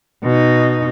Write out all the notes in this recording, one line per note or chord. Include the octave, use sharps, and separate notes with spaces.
B2 D#4